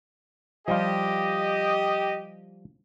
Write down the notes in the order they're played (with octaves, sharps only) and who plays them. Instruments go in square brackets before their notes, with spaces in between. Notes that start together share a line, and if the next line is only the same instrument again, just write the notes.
[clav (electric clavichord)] F3 G3 F4 [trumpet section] G4 D#5